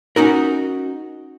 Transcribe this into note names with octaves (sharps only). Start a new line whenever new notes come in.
C#4 D#4 F#4 A#4